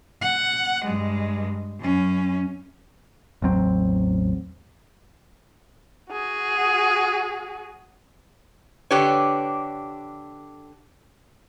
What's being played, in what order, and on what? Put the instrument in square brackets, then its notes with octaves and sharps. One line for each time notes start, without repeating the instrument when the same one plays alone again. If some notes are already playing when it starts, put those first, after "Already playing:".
[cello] F#5
G2 G#3
F#2 C#4
[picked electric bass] A1 E2 F#3 C4
[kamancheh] F#4 G#4
[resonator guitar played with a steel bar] D3 D4 G4 B4 C#5